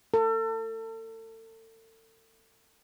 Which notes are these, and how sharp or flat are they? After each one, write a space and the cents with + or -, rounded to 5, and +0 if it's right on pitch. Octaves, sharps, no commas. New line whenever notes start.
A4 +35